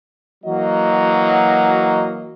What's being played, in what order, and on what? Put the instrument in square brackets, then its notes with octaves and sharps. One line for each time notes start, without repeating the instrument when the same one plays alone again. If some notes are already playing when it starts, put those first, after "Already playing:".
[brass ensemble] E3 F#3 A#3 F#4 D#5